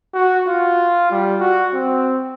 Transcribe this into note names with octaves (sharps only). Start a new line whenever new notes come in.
F#4
F4
G3
F#4
C4